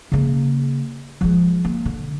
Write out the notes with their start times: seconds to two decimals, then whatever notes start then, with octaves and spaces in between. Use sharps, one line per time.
0.12 C#3 A#3
1.21 F3 G#3
1.65 A#3
1.85 D3